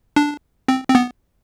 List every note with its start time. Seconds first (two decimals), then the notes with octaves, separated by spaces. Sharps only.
0.16 D4
0.68 C4
0.89 C4
0.95 B3